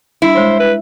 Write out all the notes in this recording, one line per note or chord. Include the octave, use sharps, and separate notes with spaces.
G3 D4 E4
G#3 C5 C#5
B4